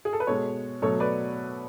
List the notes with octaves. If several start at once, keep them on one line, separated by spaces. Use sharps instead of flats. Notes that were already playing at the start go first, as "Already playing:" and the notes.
G#4
A4
B4
B2 G#3 A4 C#5
B2 F#3 A3 A4 C#5
B4 D5